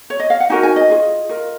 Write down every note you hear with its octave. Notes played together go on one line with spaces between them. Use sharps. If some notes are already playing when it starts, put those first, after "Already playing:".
C#5
D#5
F5
F#5
D#4 F#4 A#4 G#5
G#5
D#5
F4 G#4
F4 A#4